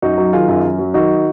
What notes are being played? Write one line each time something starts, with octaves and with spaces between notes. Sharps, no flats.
F#2 D#4 F#4
F#3
D#3 F4 G#4
F#2
F#2
F#3
D#3 D#4 F#4